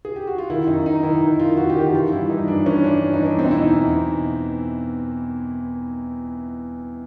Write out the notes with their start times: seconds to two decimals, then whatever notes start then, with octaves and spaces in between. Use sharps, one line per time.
0.05 G#4
0.16 G4
0.27 F#4
0.38 F4
0.50 D#3 E4
0.67 F#2 D#4
0.86 F#2 D#4
1.03 D#3 E4
1.21 D#3 D#4
1.33 E4
1.40 F#2 F4
1.57 F#2 F#4
1.70 G4
1.76 D#3
1.81 F#4
1.93 E3 F4
2.11 G2 E4
2.29 G2 D#4
2.48 E3 D4
2.66 E3 C#4
2.84 G2 D4
3.02 G2
3.14 D#4
3.21 E3
3.26 D4
3.38 B2 C4
3.46 D#4
3.51 E4
3.57 E2
3.62 D#4
3.74 E2
3.93 B2